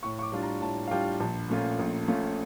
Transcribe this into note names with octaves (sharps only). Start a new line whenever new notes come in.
A2 C#6
C#6
D6
G3 D4 F4
A#5
A2 A5
F5
G3 D4 F4 G5
A#1 A5
A#2 A3 C#4 F4
A#1
A#2 A3 C#4 F4